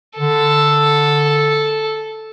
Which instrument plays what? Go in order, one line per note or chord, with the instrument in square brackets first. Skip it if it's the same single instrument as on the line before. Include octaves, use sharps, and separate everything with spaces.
[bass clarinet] D3 [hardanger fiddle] A4